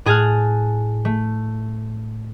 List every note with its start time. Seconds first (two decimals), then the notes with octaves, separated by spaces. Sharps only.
0.05 A2 G#4 G#5 A5 F6 F#6
1.05 A3